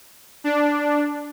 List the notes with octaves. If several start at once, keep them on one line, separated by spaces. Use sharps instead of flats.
D4